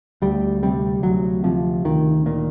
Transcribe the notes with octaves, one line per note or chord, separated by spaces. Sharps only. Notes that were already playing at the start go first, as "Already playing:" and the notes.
D2 G3
C3 G3
D2 F#3
C3 F3
D2 D#3
A#2 D#3